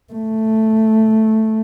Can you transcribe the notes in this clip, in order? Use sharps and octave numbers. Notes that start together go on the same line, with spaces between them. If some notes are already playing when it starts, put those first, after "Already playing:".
A3